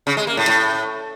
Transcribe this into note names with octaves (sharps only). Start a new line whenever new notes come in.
C#3
G#3
A#3
A2
A2